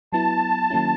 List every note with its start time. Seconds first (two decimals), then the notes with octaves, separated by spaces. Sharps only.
0.12 F#3 B3 E4 A5
0.70 D#3 F#3 A#3 C#4 E4